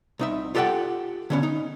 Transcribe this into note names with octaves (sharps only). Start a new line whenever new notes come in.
C2 D#4 E5
F4 G4 A4 D#5 F#5 G5
D3 B3 C#4
D#4